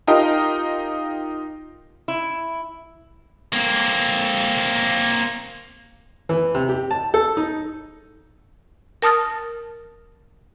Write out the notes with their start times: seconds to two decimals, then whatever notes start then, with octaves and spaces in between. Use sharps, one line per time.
0.07 D#4 F4 G4 A#4 D#5
2.08 E4
3.53 A#3 C4
6.29 E3
6.55 C3
6.69 G4
6.91 A5
7.14 A4
7.37 D#4
9.02 A#4 A5 D#6 F6 A6